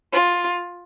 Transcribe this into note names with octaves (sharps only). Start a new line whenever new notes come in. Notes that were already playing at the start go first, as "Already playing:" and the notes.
F4